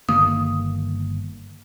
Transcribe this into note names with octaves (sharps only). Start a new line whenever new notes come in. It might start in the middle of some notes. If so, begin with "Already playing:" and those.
G1 D#3 A#3 D#6